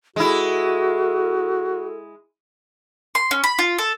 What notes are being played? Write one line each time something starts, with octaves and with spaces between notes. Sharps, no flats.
G#3 E4 F#4 A4
C6
C#4
B5
F4
A4